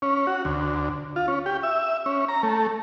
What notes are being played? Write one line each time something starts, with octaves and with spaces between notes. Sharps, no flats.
C#4
F#4
D2
F4
C#4
G4
E5
C#4
A#5
A3